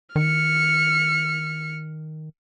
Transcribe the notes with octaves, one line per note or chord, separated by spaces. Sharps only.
D#3 F6 C#7